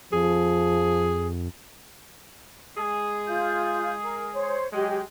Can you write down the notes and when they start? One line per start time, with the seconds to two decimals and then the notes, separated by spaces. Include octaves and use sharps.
0.13 F2 F3 G#4
2.78 G#3 G#4
3.27 F4 G6
4.02 A#4
4.34 C5 C#5
4.72 F#3 G#3 G4